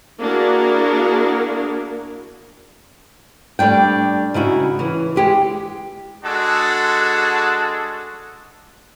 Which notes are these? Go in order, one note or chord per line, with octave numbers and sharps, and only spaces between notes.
A#3 D4 E4 F#4 G#4 A#4
G3 A3 D4 G5
C#3 D#4 E4 F#4
C#3 E3
G#3 G4 G#4
G#3 D4 F#4 G#4 A4